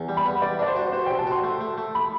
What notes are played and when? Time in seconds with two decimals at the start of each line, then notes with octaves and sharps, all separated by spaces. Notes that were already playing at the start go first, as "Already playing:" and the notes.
Already playing: E2
0.09 G3
0.17 B5
0.25 B3
0.42 G3 D5
0.59 D4 D5
0.67 C5
0.76 F#4
0.92 F#4 C5
1.06 C3 G5
1.19 A5
1.27 F#4 C6
1.44 A3
1.61 A3
1.78 A3
1.95 B5